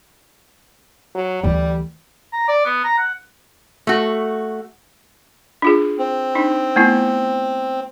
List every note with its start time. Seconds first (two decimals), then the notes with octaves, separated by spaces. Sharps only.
1.15 F#3
1.43 D2 E3 G3
2.32 A#5
2.48 D5
2.65 B3
2.84 A#5
2.97 F#5
3.87 A3 F#4
5.62 D4 F4 G#4
5.98 C4
6.35 D4 D#4
6.76 A3 B3 E4